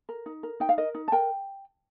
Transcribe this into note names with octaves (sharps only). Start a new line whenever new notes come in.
A#4
D#4
A#4
D#4 G5
F5
A#4 D#5
D#4
A5
A#4 G5